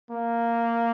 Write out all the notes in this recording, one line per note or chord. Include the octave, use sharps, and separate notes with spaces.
A#3